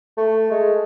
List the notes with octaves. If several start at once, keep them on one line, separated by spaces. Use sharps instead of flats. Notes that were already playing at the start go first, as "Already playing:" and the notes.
A3
G#3